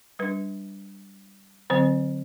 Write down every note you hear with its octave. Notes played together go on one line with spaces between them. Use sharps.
G3 D4 B4
D3 F#3 C4 C5